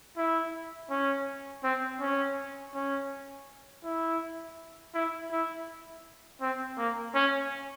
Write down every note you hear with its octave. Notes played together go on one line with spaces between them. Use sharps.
E4
C#4
C4
C#4
C#4
E4
E4
E4
C4
A#3
C#4